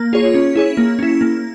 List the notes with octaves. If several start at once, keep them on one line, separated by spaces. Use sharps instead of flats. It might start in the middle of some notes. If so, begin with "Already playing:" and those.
Already playing: A#3
F4 G#4 C#5
C#4
E4 G#4 C#5
A#3
C#4 E4
A#3